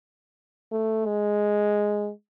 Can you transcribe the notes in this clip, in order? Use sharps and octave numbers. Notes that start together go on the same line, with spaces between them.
A3
G#3